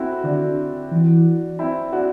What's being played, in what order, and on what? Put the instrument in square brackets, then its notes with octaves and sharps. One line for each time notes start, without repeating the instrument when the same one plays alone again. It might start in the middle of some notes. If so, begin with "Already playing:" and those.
Already playing: [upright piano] C4 E4 F#4 A4
[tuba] D3 [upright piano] D4 F#4
[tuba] E3
[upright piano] C4 E4
D4 F#4